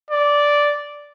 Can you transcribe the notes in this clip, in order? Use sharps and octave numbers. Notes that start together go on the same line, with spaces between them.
D5